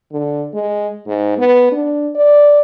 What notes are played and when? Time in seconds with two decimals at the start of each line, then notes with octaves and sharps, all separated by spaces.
0.12 D3
0.54 G#3
1.07 G#2
1.38 B3
1.72 D4
2.15 D5